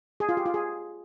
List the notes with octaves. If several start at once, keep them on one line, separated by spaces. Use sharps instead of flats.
G#4
F4
G4
F4
G#4